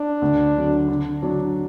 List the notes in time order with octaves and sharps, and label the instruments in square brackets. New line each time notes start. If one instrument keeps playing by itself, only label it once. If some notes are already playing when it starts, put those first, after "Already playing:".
Already playing: [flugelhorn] D4
[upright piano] D2
D3 F#3
D3
F#3 D4